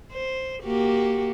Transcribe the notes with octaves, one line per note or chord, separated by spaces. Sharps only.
C5
A#3 F#4 G4